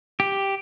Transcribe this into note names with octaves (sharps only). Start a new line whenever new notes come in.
G4